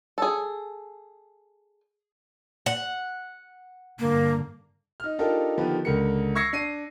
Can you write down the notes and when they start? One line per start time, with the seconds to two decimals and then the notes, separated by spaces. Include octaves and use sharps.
0.18 G#4 A4
2.66 F#5
4.00 G2 D3 A#3
5.00 D#4 F6
5.19 D4 D#4 F4 G4 A4 A#4
5.57 D3 D#3 F3 B3 G4 B4
5.85 C#2 D3 A#4 C#7
6.35 C#6 E6 G#6 A#6 C7 C#7
6.53 D4 C7 D#7